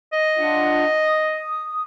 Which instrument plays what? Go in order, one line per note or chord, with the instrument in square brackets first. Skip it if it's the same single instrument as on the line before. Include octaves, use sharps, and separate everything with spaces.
[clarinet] D#5
[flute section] D4 F4 F#5
D#6